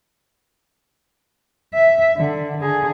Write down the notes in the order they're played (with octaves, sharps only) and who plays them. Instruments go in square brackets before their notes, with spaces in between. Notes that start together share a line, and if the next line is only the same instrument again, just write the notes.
[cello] E5
D3
D3 G#4